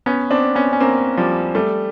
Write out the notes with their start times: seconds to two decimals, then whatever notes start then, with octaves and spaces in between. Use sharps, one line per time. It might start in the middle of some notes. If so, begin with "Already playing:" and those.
0.06 B3 C#4
0.31 C4 D4
0.55 B3 C#4
0.73 C#4
0.80 A#3 C4
1.17 F3 G3
1.55 G3 A3